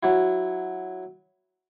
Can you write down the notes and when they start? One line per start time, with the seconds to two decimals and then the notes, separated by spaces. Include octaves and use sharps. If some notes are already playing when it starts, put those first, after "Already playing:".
0.03 F#3 E4